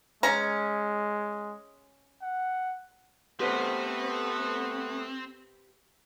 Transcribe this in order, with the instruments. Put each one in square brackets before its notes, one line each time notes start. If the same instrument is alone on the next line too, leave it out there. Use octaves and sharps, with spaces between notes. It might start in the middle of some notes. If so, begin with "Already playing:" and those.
[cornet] G#3 [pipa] C#4 A#5
[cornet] F#5
[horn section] A3 B3 [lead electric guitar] C4 [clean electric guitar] G4 B4 C5